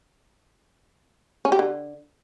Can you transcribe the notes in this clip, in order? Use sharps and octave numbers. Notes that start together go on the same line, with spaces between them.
C#4
G4
D3